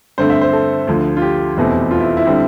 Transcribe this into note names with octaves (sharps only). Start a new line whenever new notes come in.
G2 D3 A3 C4 C5
E5
C5
A4
D2 D3 F3
F4
G4
F1 E2 B2 A3 C4
F4
E4
E4
D3 G3 C4